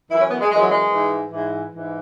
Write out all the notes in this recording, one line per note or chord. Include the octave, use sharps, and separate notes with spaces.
F#2 E3 E4
C#4
B3
G#3
F#2 E3 G#3
F#3
G#3
G#2 E3
G#2 E3
G#2 E3